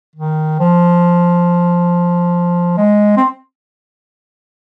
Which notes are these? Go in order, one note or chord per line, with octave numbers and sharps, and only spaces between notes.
D#3
F3
G#3
C4